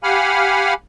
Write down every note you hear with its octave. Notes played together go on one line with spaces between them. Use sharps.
G4 F5 F#5 G#5 B5 F6